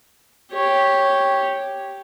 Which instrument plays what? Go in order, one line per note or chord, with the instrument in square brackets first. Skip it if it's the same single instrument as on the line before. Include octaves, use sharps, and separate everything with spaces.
[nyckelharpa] G4 C#5